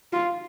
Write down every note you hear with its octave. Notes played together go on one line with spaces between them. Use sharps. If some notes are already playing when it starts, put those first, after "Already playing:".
F4